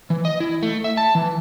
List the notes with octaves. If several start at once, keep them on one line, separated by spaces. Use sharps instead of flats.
E3
D#5
E4
A3
E5
A5
E3